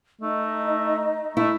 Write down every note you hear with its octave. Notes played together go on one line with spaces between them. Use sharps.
A3 D#4 D#5
A3 E4